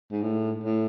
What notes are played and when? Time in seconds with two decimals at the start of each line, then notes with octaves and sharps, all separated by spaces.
0.12 G#2
0.22 A2
0.64 A2